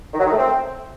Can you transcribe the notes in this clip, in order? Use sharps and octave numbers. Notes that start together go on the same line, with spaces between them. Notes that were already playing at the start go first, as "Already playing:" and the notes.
D#3
F#3
D#3
A3
C4